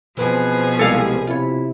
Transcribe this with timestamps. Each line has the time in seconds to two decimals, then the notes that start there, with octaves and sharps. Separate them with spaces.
0.17 B2 E3 F3 C4 G#4 B4
0.79 C2 G3 G#3 A#3 E4 A4 F5
1.27 C3 E4 F4 C#5